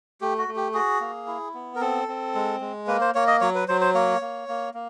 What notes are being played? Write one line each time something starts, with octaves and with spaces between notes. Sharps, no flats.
A3 G4
F#4
A3
G4
F#4 G#4
A#3
E4
B3
A#4
C4 A4
C4
G#3
G#3
A#3 B4
C5
A#3 C#5
D#5
F#3 C#5
B4
F#3 C5
C5
A#3 C#5
A#3
A#3
A#3